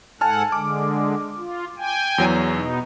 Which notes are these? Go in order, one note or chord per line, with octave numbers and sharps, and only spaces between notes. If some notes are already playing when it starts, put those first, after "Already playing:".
G#2 A4 F#5 G#5 A5 F6
D3 G#3 D6
F4
G5 G#5
E2 F#3
B2 B3 D#4